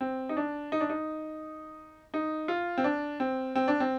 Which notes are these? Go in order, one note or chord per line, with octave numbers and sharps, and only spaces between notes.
C4
D#4
D4
D#4
D4
D#4
D#4
F4
C4
D4
C4
C4
D4
C4